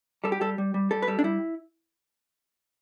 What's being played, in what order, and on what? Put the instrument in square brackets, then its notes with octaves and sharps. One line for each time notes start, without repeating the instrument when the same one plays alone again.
[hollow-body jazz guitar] G3 A4
G4
G3 A4
G3
G3
G3 A4
B4
G3 A4
D4
G3 E4